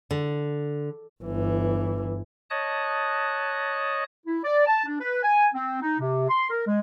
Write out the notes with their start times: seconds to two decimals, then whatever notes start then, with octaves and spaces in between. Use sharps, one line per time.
0.11 D3
1.23 G1 E3
2.50 C#5 D#5 A5 D#6 F#6
4.26 E4
4.44 D5
4.66 A5
4.85 D4
5.00 B4
5.23 G#5
5.54 C4
5.81 D#4
5.99 C3
6.30 C6
6.50 A#4
6.67 G#3